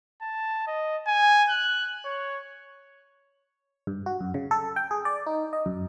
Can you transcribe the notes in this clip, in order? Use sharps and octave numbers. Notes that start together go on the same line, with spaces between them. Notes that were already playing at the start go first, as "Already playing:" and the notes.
A5
D#5
G#5
F#6
C#5
G2
F#4
F#2
C#3
A4
G5
G#4
D5
D#4
D#5
F#2